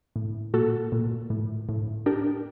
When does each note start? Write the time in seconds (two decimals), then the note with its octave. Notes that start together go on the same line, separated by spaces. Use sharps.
0.16 A2
0.54 A#2 F#4 A4
0.92 A#2
1.30 A2
1.69 A2
2.06 D4 G4 A#4